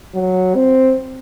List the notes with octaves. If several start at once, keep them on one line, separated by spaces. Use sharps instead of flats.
F#3
C4